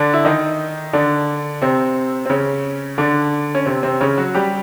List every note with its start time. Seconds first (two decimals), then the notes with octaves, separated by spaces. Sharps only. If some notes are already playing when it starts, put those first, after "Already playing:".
Already playing: D3 D4
0.14 E4
0.25 D#3 D#4
0.93 D3 D4
1.62 C3 C4
2.26 C4
2.30 C#3 C#4
2.98 D3 D4
3.55 C#4
3.66 C3 C4
3.83 C3 C4
4.00 C#3 C#4
4.18 F#3 F#4
4.35 G3 G4